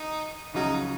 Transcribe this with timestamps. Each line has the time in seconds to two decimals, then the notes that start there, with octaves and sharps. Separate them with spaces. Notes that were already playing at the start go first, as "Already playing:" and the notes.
Already playing: D#3 D#4
0.54 C#2 C#3 F#3 C#4 D#4 F#4